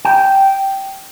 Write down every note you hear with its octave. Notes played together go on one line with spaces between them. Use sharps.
G5